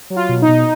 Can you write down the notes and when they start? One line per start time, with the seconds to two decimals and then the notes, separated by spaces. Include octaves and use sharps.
0.10 F#3
0.16 F4
0.29 B2
0.42 D#4
0.48 B2